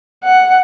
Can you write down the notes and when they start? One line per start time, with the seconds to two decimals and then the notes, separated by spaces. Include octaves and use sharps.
0.24 F#5